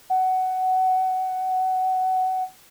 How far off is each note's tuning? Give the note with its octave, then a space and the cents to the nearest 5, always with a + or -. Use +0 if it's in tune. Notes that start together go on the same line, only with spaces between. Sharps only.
F#5 +15